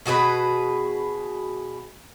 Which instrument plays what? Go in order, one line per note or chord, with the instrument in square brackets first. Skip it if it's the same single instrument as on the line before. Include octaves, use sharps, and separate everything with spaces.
[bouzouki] B2 F#4 G#4 B4